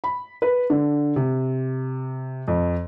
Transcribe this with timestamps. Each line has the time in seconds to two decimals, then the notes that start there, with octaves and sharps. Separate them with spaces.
0.04 B5
0.42 B4
0.70 D3
1.16 C3
2.48 F2